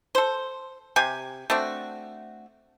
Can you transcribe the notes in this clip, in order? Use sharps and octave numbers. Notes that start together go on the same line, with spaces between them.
A4 C5
C3 G4 G#5
A3 C4 D4 F#4